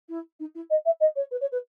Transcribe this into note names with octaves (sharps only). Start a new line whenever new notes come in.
E4
D#4
E4
D#5
E5
D#5
C#5
B4
C#5
B4